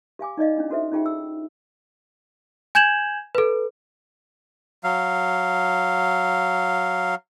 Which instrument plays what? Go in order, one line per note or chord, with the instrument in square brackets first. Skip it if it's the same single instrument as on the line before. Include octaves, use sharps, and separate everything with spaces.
[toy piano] G4 F5 G#5 D6
D#4 D5 D#5 F5
C#4 D4 E4
C#4 F#4 A4 C5 E5
C#4 D#4 F4 G#4 F#5 G5
E6
[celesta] G#5 G6 G#6 E7 F#7
A4 B4
[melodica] F#3 F5